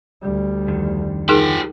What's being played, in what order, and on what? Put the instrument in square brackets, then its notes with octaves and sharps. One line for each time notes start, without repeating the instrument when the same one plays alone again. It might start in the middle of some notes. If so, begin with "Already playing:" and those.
[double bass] D2 G3
[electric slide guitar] F2 D3 D#3
[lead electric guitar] F3 G4 [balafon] D#4 G#4 A#4